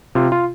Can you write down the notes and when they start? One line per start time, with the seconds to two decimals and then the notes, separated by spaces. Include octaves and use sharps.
0.15 C3 F4
0.32 F4